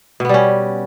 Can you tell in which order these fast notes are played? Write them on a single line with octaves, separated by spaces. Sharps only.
B2 B3 G3 C#4